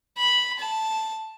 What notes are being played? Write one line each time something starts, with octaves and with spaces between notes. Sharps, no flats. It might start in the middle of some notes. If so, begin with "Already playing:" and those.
B5
A5